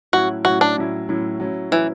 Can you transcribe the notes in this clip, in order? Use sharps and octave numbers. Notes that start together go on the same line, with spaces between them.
A2 F#3 C#4 E4 F#4
A2 F#3 C#4 E4 F#4
D4
A2 F#3 C#4 E4
A2 F#3 C#4 E4
F#3 C#4 E4
E3 F#3 C#4 E4